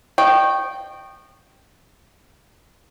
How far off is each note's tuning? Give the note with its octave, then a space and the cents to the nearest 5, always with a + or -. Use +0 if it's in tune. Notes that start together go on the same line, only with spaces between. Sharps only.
D#5 -40 G5 -10 C#6 -15